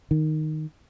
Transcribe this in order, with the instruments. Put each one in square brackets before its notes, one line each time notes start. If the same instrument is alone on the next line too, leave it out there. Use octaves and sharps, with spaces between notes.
[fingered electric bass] D#3